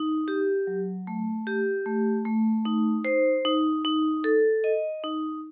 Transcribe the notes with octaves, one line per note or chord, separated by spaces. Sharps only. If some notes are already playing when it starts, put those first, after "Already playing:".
Already playing: D#4
G4
F#3
A3
G4
A3
A3
D#4
C5
D#4
D#4
A4
D#5
D#4